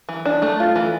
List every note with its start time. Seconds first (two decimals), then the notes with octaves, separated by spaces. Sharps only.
0.09 E3
0.25 D4
0.42 A3
0.60 F4
0.76 E3